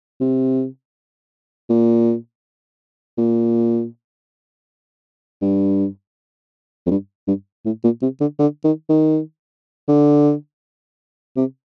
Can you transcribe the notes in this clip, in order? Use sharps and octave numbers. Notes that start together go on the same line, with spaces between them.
C3
A#2
A#2
G2
F2
G2
G2
A2
A#2
C3
D3
D3
D#3
D#3
D3
C3